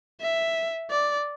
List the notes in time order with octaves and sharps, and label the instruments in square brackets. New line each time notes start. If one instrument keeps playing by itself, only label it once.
[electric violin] E5
D5